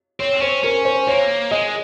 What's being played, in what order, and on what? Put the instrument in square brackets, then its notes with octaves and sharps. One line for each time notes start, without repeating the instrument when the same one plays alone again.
[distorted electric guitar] C4 [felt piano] C#5
[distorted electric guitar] C#4 [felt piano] C5
[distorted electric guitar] C#4 [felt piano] A#4
[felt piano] C5
[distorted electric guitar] A#3 [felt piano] C#5
[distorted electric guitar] G#3 [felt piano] D#5